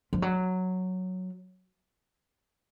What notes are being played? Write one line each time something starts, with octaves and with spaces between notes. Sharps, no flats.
F3
F#3